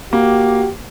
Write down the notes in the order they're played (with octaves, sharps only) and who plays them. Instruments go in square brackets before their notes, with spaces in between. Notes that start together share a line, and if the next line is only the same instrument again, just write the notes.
[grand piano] A#3 [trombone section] F#4 G4